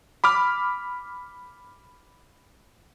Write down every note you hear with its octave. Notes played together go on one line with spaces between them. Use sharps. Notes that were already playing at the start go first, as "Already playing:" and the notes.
B5 D6 F6